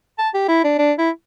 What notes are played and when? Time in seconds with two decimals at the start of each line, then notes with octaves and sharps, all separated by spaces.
0.18 A5
0.34 G4
0.49 E4
0.64 D4
0.79 D4
0.98 E4